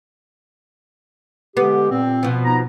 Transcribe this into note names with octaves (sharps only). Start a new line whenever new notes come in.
D3 G#3 B3 G4
A#2 C4
B2 F3
B3 D#4 A#5